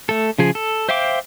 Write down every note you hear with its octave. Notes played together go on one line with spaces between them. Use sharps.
A3 A4
C#3 F3 G#4
A4
C5 E5 F5 G5 D6